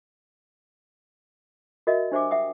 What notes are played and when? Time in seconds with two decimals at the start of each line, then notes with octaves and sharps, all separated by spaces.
1.87 F#4 A#4 D#5 E5
2.12 D4 G4 C5 E5 G#5 D6
2.31 E5 F#5 G5 D#6